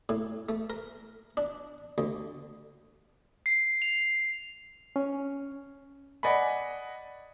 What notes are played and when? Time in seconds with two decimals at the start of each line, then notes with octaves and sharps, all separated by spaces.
0.09 A2
0.49 A3
0.70 A#4
1.37 D4
1.98 D2
3.46 C7
3.82 F7
4.96 C#4
6.23 D5 D#5 F#5 G#5 B5